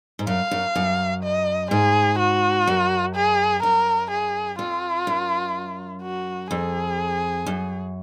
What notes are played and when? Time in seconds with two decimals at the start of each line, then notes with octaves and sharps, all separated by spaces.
0.19 G#2
0.27 F#2 F5
0.51 F#2
0.75 F#2
1.24 D#5
1.71 G#2 G#4
2.19 F#4
2.67 F#2
3.15 G#4
3.63 F#2 A#4
4.11 G#4
4.59 F2 F4
5.07 F#2
6.02 F#4
6.50 F2 G#4
7.46 F#2